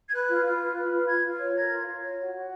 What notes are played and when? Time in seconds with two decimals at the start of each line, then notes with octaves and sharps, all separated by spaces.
0.08 G#6
0.12 B4 F#6
0.29 F4
0.44 F4
0.59 B4
0.76 B4
0.91 F4
1.07 F4 G#6
1.23 F4
1.39 C#5
1.55 A#4 G#6
1.70 F4
1.86 F4
2.02 C#5
2.18 F#4
2.34 F#4